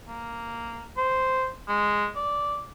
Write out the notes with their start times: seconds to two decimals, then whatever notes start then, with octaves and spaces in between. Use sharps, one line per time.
0.08 A#3
0.97 C5
1.68 G#3
2.16 D5